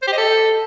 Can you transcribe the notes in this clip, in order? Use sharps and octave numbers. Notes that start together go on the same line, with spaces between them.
C5
G4
D#5
A4